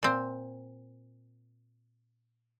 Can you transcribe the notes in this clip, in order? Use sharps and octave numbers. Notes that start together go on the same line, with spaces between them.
A#2 C4